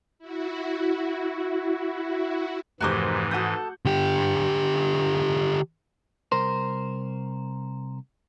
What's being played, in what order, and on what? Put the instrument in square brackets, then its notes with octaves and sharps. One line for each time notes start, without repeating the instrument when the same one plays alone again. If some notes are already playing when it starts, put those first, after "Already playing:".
[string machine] E4 F#4
[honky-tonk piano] F1 D6 [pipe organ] G#2 E3 [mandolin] F#4 A#4 C5
[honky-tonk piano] F#4 F#5 G6 [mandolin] A4 D#6
[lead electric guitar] D3 G4
[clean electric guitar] C2 A#4 C5